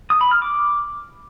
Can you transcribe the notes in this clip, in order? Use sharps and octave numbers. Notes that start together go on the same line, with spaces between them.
D#6
B5
F6
D6